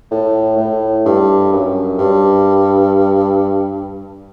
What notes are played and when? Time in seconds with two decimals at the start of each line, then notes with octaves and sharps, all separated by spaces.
0.11 A2
0.57 A2
1.05 G2
1.52 F#2
1.98 G2